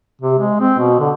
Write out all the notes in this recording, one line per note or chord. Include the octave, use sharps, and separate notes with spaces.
C3
G#3
C4
B2
D3